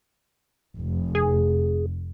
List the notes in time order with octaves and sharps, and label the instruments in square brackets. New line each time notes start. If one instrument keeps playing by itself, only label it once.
[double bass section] F1
[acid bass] G#4